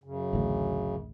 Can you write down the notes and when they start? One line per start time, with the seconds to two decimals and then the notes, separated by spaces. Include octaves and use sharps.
0.04 F#2 C#3
0.33 A1 D2